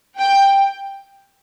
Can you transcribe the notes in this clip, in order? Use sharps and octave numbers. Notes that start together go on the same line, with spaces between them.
G5